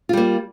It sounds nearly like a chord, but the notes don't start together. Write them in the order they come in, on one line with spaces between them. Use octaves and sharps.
F4 G3 A#3